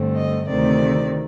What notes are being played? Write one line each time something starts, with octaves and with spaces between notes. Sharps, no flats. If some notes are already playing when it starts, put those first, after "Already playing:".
Already playing: G2 D3 A3 C4
D#5
D2 C3 D#3 A3 C4 D5